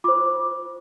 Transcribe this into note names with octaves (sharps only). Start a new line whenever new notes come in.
F4 C5 D6